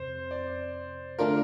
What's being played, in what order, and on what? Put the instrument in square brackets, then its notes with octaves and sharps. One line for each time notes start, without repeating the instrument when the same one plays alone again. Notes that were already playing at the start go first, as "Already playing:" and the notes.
Already playing: [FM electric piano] F2 C3 [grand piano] C5
[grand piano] D5
[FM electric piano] D3 A3 D4 F4 [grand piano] A#4